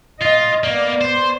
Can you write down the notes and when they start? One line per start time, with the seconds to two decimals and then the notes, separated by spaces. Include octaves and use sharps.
0.21 F4 D#5
0.64 A#3 B3 D5
1.01 C5